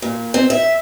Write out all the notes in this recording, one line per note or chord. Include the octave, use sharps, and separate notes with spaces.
A#2
C4
E5